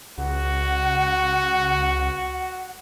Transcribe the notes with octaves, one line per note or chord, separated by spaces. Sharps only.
C#2 F#4 F#5